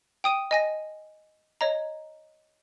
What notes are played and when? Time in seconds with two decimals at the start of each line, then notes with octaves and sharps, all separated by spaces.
0.24 G5 D#6 D#7
0.51 D#5 G#5 A#6
1.61 C#5 D#5 A#5